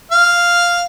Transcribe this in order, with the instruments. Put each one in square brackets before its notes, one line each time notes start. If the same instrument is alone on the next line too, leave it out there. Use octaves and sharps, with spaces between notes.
[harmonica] F5